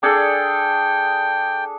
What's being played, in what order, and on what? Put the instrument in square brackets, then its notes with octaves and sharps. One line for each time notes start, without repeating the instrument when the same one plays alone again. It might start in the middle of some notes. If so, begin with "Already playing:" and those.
[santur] D4 G#4 A4 [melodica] G5